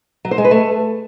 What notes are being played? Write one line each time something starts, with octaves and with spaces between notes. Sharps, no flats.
F#3
C5
G#3
B4
A3